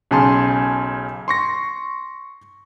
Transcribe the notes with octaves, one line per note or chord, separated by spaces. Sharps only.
B1 C#3 G#5 A5 C6
C6 C#6 A#6